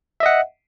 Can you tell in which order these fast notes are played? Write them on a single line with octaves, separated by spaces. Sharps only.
E5 D#5 F#5